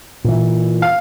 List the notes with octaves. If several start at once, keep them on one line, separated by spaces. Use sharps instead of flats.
A#2 E3
F5